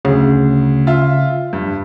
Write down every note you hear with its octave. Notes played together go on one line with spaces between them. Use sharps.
D2 C#3
F4 E5
G2